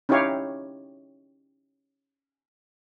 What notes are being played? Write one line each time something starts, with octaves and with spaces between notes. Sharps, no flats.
C#4 D#4 E4 G4 C#5 F5